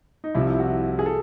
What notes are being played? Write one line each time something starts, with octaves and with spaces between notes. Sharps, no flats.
D#4
C2 C3 F3 E4
F#4
G#4
A4